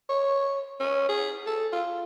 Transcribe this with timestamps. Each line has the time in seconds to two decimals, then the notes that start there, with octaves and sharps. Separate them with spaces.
0.09 C#5
0.80 C#4
1.09 G#4
1.47 A4
1.72 F4